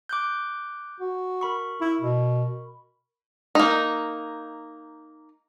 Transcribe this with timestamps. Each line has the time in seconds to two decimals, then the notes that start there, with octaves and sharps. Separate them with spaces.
0.09 D6 F#6 G6
1.00 F#4
1.41 A#4 B5 C#6
1.81 E4
2.01 B2
3.55 A#3 D#4